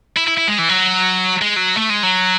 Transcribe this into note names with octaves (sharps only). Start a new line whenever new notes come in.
E4
E4
E4
G#3
E3
F#3
G#3
F#3
A3
G#3
F#3